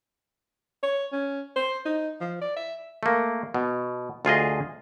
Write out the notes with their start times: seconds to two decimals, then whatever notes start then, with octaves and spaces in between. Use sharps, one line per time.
0.83 C#5
1.12 C#4
1.56 C5
1.86 D#4
2.21 F3
2.41 D5
2.56 E5
3.03 A3 A#3
3.54 B2
4.25 D2 F4 G#4 D#5